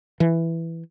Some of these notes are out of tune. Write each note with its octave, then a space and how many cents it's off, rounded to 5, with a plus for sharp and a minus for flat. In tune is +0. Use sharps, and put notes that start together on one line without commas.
E3 +5